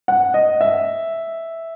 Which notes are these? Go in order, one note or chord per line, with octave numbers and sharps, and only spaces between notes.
F#5
D#5
E5